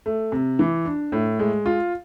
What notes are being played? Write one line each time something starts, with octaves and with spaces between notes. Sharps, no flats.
A3
C3
E3
D4
A2
G#3
F4